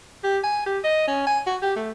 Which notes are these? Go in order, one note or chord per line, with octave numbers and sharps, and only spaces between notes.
G4
G#5
G4
D#5
C#4
G#5
F#4
G4
A3